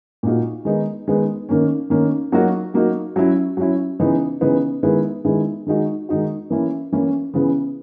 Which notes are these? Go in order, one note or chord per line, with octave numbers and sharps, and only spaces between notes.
A#2 A#3 D#4 F#4
D#3 G#3 B3 D#4
D#3 G#3 B3 D#4
D#3 A#3 C#4
D#3 A#3 C#4
F#3 A#3 D#4 F#4
F#3 A#3 D#4 F#4
F#3 C#4 E4
F#3 C#4 E4
C#3 E3 B3 D#4
C#3 E3 B3 D#4
D#3 G#3 B3 E4
D#3 G#3 B3 E4
D#3 G#3 D#4 F#4
D#3 G#3 D#4 F#4
E3 A#3 C#4 E4
E3 A#3 C#4 E4
C#3 E3 B3